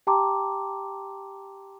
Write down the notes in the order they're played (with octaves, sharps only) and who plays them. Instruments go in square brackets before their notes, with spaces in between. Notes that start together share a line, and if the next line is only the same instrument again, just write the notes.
[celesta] G4 G5 A5 A#5 C6 D6